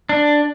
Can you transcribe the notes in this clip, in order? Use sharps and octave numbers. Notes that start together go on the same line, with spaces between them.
D4